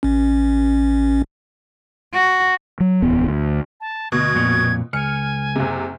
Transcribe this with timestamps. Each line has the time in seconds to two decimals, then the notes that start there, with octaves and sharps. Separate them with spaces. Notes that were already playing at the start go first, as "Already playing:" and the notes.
0.03 A1 C#4
2.13 F#4
2.80 F#3
3.02 D1 E2 B3
3.27 D2
3.81 A5
4.12 D2 B2 G#6
4.35 F2 A#2
4.93 C#2 G#5 F6 C#7
5.56 F#1 C3